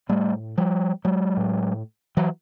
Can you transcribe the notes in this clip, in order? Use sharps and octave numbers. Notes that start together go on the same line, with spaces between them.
A2 G3 A3
F3 G3
F#3 G#3
A2
E3 F#3